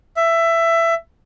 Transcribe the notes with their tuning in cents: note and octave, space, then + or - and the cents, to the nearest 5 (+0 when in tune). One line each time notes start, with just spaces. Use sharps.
E5 +15